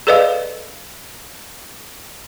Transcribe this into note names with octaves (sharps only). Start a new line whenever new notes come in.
G#4 A4 B4 D5 D#5 F5